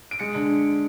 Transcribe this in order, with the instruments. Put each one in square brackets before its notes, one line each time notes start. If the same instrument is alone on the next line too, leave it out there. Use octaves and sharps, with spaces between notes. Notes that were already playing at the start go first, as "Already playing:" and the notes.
[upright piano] D7
G#3 C#7
D3